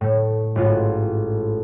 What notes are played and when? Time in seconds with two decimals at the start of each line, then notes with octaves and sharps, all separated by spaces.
0.01 A2 A3
0.56 A1 G#2 F4 F#4